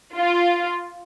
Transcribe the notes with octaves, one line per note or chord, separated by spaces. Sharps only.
F4